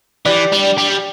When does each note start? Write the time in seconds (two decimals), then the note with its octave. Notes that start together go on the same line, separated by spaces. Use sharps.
0.25 E3 D4 G4 D5
0.52 G3
0.78 G3